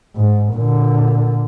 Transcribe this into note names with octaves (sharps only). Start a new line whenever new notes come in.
G#2
A#2 D3